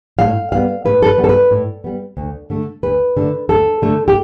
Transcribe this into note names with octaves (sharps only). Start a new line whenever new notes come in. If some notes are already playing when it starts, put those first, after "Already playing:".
A2 F5
G3 B3 F5
A2 B4
A4
B4
G3 B3
A4
B4
A2
G3 B3
D2
D3 A3
D2 B4
D3 A3
D2 A4
D3 A3
G4